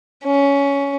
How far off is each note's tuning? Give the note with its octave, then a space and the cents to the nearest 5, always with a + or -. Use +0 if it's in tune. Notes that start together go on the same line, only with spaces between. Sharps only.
C#4 +15